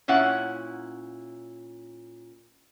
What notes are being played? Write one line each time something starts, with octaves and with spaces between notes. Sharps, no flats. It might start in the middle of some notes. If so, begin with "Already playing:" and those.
A#2 C#4 E4 F#5